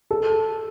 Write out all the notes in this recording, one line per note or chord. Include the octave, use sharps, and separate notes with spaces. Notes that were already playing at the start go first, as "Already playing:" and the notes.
A4